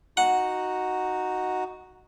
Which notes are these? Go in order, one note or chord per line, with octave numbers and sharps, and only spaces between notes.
D#4 F#4 F#5